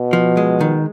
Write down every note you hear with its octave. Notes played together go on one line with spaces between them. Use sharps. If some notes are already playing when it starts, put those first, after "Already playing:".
Already playing: B2
F3
G#3
D#3